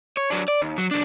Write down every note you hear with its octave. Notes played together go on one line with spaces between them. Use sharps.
C#5
F#3 D4
D5
D#2
F#3
B1 D4